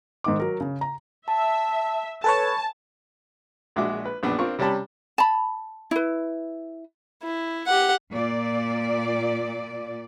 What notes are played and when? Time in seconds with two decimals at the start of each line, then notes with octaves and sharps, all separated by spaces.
0.24 G#2 D#3 D6
0.40 F#3 A#4
0.60 C#3
0.81 A#5
1.28 E5 A5
2.24 A4 B4 C#5 G#5 A5
3.76 A#1 G#3 D4 F#4 E5 D6
4.05 B4
4.23 A#1 F#2 B3 D4 B4
4.39 C4 D4 F4 A#4 C#6
4.59 C3 G3 C#4 G4 A5 B5
5.18 A5 B5
5.91 E4 B4
7.23 E4
7.67 G4 F#5
8.11 A#2 D5